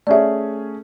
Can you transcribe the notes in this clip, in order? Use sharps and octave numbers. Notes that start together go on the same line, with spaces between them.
A3 C#4 G#4 D5 E5